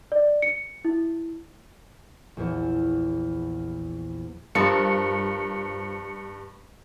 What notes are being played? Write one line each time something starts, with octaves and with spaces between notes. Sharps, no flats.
D5
C#7
E4
A#1 E2
G2 F3 C4 A#4 C#7